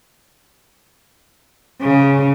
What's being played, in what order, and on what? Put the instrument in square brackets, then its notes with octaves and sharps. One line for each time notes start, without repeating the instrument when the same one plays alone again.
[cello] C#3